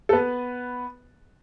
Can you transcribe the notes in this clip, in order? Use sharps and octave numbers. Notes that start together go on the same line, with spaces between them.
A4
B3 B4